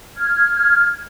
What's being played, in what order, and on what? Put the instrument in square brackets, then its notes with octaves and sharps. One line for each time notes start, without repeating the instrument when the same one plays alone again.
[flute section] F6 G#6